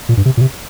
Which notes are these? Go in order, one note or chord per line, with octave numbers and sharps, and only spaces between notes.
A#2
G2
C3
A#2
C3